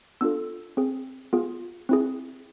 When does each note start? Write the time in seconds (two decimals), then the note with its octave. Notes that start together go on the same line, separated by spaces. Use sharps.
0.21 B3 D4 F4 A4 E6
0.77 C4 G#4
1.33 B3 F4 G#4
1.89 C4 E4 G#4